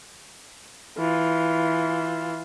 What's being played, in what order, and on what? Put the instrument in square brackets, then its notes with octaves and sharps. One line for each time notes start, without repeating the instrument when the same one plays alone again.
[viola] E3 F4